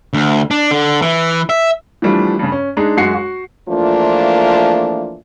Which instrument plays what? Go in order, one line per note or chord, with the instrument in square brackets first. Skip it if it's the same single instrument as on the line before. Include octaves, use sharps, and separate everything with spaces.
[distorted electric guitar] D2
D4
D3
E3
E5
[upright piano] E3 F3 G3 A3 D4
G2 C#3
C#4
G#3 D4 D#4 G#4
F#2 G#3 F#4 C7 C#7
F#4
[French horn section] E3 F3 A3 A#3 D4 F4